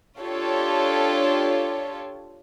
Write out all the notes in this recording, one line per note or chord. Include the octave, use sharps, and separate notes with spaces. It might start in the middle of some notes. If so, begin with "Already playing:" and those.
D4 F4 G4 A4 C#5